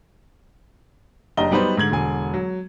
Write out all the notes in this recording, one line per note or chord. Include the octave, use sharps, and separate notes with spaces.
F#1 D4 G4 D#5 A#5 G7
F#3 G3 B3 D#4 B4 C5
G#2 D3 G#6 F#7
E1 D3 G#5
F#3